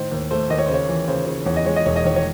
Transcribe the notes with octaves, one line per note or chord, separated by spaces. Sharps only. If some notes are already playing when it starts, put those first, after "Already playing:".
Already playing: A2 D#3 C5
D#2
A3 C5
D#2 D#5
C#5
C5
C#3 C#5
E3
C#3 C5
C#3
E2 C#5
D#5
G#3 C#5
D#5
E1 C#5
D#5
D#3 C#5
C#5